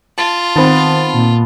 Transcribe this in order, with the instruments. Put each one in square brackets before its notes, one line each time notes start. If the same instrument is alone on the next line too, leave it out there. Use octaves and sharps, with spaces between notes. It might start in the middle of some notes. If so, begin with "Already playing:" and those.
[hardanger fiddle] F4 [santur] A5
[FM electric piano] D#3 C4 [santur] B3 A5
[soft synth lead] A#2